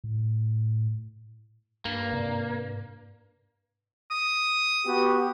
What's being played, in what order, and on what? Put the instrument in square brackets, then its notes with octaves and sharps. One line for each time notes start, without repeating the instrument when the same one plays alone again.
[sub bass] A2
[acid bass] G2 [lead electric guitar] A#3
[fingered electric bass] G#2 C3 C4
[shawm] D#6
[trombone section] B3 F#4 G4